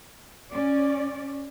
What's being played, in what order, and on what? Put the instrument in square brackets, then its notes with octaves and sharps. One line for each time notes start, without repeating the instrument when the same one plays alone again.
[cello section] C#4 D5